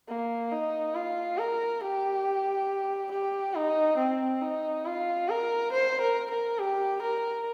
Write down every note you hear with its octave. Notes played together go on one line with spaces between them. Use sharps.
A#3
D#4
F4
A#4
G4
G4
D#4
C4
D#4
F4
A#4
C5
A#4
A#4
G4
A#4